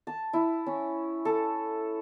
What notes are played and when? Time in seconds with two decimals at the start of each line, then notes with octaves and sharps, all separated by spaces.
0.07 A5
0.33 E4
0.66 C#4
1.25 A4